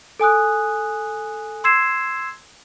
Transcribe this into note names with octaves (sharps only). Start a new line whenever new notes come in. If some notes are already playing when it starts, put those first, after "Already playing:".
A4 G#5 D#6 F#6
C6 E6 G#6 C7 E7